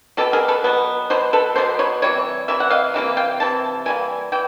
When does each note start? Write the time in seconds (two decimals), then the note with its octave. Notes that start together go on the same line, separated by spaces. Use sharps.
0.17 B2 F#3 B3 G4 A4
0.33 G#4 A#4
0.48 A4 B4
0.64 B2 F#3 B3
1.10 B2 F#3 B3 C5
1.33 A4 B4
1.56 B2 F#3 B3 C5
1.79 B4 C#5
2.02 C3 E3 G3 C#5
2.48 C3 E3 E5
2.60 F#5
2.70 D#5 F5
2.94 C3 E3 G3 A#3
3.17 F5 G5
3.40 C3 E3 A5
3.86 E3 G3 A#3 G#5
4.32 E3 G5